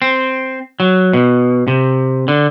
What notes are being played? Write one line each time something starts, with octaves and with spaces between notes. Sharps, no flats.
C4
F#3
B2
C3
D3